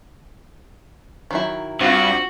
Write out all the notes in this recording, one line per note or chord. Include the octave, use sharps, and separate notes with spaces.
D#3 F#3 E4
G2 C4 F4 F#4